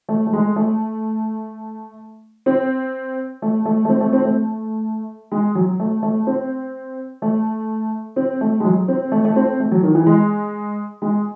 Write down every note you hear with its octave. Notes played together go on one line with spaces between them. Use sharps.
A3
A3
G#3
A3
C4
A3
A3
A3
C4
A3
C4
A3
G#3
F#3
A3
A3
C4
A3
C4
A3
G#3
F#3
C4
A3
A3
C4
A3
F#3
D#3
E3
G#3
G#3